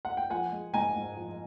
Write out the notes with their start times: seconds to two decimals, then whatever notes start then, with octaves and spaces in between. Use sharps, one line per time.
0.05 F#5
0.17 G5
0.30 F3 F#5 G#5
0.52 G#3
0.74 G#2 G#5 A#5
0.96 G#2
1.17 F3